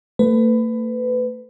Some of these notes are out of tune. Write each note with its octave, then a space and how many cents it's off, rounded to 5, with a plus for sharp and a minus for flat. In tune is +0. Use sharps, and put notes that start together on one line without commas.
A3 +45 B4 +25